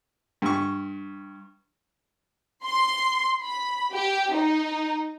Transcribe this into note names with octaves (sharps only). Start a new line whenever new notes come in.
G2 C#6
C6
B5
G4
D#4